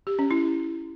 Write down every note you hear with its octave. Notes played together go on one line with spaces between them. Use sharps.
G4
C#4
E4